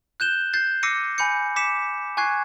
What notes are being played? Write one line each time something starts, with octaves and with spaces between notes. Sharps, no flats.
F#6 G6 E7 G7
G6 A6 C7
D6 E6 A#6 C7 C#7 D#7
G#5 B5 G6 C#7
D6 B6 C#7 E7
G#5 C#6 F#6 G#6 C7